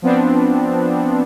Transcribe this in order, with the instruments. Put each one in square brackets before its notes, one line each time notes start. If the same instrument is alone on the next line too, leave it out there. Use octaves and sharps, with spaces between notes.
[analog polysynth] F3 B3 C4 D4